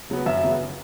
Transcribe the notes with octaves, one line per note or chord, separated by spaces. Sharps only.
C#3 F#3 B3
F#2 E5
C#3 F#3 B3